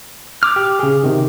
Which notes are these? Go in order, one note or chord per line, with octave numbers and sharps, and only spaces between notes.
D6 F6
G4
C#3 G#4
C3 D#3